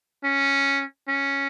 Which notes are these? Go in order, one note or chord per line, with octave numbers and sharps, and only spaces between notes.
C#4
C#4